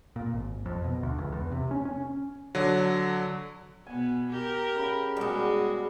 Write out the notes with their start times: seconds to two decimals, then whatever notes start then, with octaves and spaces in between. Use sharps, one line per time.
0.16 A#2
0.33 G#1
0.66 F2
0.84 B2
1.03 D2
1.18 C#2
1.32 E2
1.51 C3
1.71 C#4
1.85 C#4
2.55 D3 F#3
3.87 B2 B3 G#5
4.31 G4 A#4
4.76 C#3 B5
5.17 B2 G3 G#3 F#4 G#4